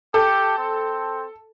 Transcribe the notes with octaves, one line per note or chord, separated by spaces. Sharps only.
G4 A4
C4